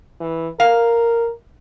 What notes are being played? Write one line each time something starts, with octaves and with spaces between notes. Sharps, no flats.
E3
A#4 F5